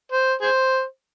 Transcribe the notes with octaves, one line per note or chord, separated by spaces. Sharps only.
C5
G#4 C5